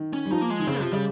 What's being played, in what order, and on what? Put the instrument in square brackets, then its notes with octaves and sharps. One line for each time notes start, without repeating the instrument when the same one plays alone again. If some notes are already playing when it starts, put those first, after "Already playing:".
Already playing: [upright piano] D#3
[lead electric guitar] C#4
[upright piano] G3
[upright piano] F3 [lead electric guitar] D#4
[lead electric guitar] A#3
G#3
[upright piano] D#3
[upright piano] C#3 [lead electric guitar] C4
[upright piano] C3 [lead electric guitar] F3
[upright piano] C#3 [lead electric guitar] G3